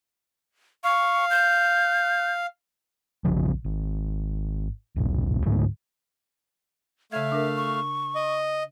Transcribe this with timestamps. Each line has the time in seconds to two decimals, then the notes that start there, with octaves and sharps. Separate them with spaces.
0.84 F5 C#6
1.31 G6
3.25 E1 A#1 C#3 F3
3.65 G#1
4.96 D#1 B1
5.46 C#2 G#2 D3 A3
7.12 C#3 A3 E5 F5 G#6
7.32 D4 A#4
7.57 C#6
8.15 D#5